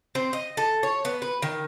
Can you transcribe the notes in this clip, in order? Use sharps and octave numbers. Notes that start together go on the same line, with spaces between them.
C4
D#5
A4
C#5
B3
B4
D#3